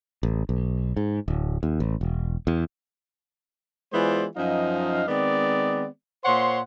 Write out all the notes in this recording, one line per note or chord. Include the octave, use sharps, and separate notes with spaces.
A1
B1
G#2
D1
D#2
A1
E1
E2
E3 G#3 B3 F4 C5 D5
F#2 F3 D#4 D#5 F5
D#3 G#3 B3 C4 D5
A#2 C5 C#5 F#5 C6